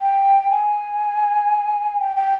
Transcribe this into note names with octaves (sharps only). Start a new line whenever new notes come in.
G5
G#5
G5
G5